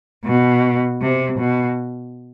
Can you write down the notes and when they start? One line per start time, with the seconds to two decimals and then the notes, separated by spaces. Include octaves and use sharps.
0.25 B2
1.01 C3
1.39 B2